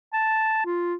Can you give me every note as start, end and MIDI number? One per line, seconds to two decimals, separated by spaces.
0.13 0.65 81
0.66 0.95 65